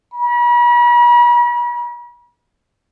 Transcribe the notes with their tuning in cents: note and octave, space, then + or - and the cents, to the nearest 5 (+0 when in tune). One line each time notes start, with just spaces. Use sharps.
B5 -45